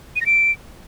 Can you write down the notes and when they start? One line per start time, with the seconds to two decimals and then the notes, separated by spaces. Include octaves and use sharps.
0.16 D#7
0.21 A#6
0.26 D7